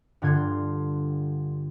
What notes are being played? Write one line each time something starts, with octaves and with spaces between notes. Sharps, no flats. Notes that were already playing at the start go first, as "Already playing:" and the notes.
G2 D3 F4 C6 G#6 C7